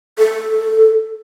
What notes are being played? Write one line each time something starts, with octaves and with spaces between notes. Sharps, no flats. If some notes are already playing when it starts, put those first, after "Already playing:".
A4